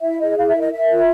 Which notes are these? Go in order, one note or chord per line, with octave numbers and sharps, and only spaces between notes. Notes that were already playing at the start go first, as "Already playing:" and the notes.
E4 E5
G#4 D#5
E4 F5
E5
A#4
D#5
A#4 E5
F4